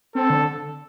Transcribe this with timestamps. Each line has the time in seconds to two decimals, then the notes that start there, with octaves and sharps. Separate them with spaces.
0.15 C4 A4
0.30 D3